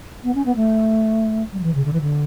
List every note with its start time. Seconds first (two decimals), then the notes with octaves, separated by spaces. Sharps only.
0.23 B3
0.34 C#4
0.45 B3
0.55 A3
1.53 G3
1.58 F#3
1.63 E3
1.74 C#3
1.84 D3
1.93 E3
2.01 D3